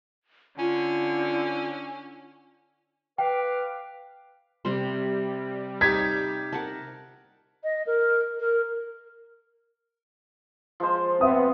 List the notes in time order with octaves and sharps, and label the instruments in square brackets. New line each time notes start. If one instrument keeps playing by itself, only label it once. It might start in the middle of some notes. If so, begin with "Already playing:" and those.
[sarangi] D3 [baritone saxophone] C#4 [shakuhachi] F4
[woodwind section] B4 F5 D6 [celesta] G5
[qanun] C3 C5 [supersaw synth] G3
[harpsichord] D#4 G4 [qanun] C5 [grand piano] G#6 B6
[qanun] A#4 F#5 A5
[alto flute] D#5
A#4
A#4
[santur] F3 G#3 C5
[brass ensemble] B3 [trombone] C4 [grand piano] E5 D#6